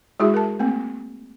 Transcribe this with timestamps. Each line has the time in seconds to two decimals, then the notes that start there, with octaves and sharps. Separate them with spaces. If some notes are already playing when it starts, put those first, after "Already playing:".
0.20 G#3 E4 F#4 G#4 E5
0.34 A#4 A5
0.59 A3 A#3 C4